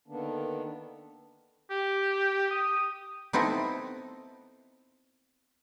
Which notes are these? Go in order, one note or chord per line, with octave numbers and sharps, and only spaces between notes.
D3 D#3 A#3 B3 D4
G4
D#6
B3 C4 D#4 E4 A4